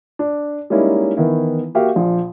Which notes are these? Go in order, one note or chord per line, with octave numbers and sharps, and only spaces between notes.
D4
G3 G#3 A#3 C#4 D#4 E4
D#3 E3 B3 E4
A#3 F#4 G4 E5 F5
A#1 F3